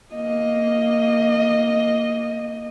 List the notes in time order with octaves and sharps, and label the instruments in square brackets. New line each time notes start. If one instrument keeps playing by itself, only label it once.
[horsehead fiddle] A#3 D#5